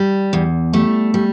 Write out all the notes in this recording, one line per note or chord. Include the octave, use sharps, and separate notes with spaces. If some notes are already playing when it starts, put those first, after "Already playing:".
Already playing: G3
E2
G3 A3
G3